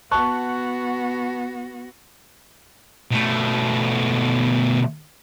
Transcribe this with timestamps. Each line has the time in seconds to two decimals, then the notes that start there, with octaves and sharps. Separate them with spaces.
0.11 B3 F#4 A5 C#6 F#6
3.11 B2 A3